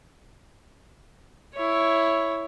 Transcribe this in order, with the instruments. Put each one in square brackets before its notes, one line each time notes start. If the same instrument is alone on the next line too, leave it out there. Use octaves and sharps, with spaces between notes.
[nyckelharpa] E4 C#5